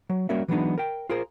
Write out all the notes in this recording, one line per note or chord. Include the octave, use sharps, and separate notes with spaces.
F#3
G3 A#3 C#4 F#4 A#4 E5
E3 F#3 G#3 B3 D4 D#4
A#4 G5
F4 G#4 A#4 C5